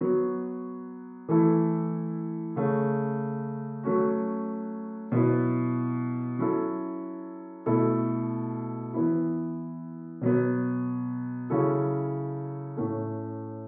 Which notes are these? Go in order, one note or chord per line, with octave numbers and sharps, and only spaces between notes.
F#3 B3 F#4
E3 A3 E4 A4
C#3 A3 C#4
F#3 A3 C#4 F#4
B2 F#3 B3 E4
F#3 C#4 E4 A4
B2 A3 E4 A4
E3 B3 E4
B2 F#3 B3
C#3 F#3 C#4 E4 A4
A2 A3 C#4